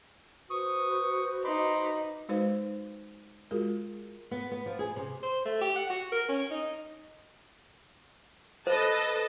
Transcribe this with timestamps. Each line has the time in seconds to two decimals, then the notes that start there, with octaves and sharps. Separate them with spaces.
0.50 F#4 B4 C5 C#6 D#6
1.45 D#4 B5 C6 D6
2.29 G#3 D#4 F#4 B4 C5 F5
3.51 G#3 F4 F#4 G#4 A#4
4.31 B3
4.52 B3
4.66 F3
4.79 G#4
4.96 C3
5.23 C5
5.46 A3
5.61 G4
5.76 F#5
5.90 F#4
6.12 A#4
6.29 C#4
6.51 D#4
8.67 A4 B4 C5 D#5 A5